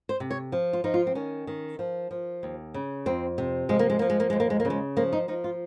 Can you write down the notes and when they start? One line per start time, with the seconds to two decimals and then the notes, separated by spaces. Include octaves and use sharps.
0.09 C5
0.20 C3
0.31 C#5
0.52 F3
0.73 F4
0.84 F3 D#4
0.94 F4
1.07 C4
1.15 D#3 C#4
1.47 D#3
1.79 F3
2.11 F3
2.43 D#2
2.74 C#3
3.06 F2 C4
3.38 C3
3.69 F3 G#3
3.79 A#3
3.90 G#3
3.99 F3 A#3
4.10 G#3
4.20 A#3
4.30 D#2 G#3
4.40 A#3
4.50 G#3
4.60 A#3
4.65 C#3
4.70 G#3
4.97 F3 A#3
5.13 D#4
5.28 F3 D#4
5.44 F4